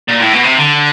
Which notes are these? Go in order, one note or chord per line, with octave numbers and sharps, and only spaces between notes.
A#2
A2
B2
C3
D3